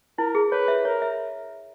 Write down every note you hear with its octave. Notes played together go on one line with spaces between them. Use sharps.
E4 A#4
G#4
B4 C#5
E5
A#4 C#5
E5